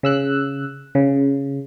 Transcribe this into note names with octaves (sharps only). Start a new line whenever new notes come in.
C#3 E6 F#6
C#3